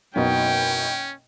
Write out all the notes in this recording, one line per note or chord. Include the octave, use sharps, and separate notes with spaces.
F#1 B2 C#4 D#4 G5